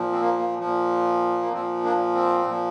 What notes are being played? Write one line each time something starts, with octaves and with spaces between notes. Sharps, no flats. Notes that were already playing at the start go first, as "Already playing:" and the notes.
Already playing: A#2 F3
C4
A#3
A#3
A#2 F3
A#3
A#2 F3 C4
A#3 D4
C4
A#2 F3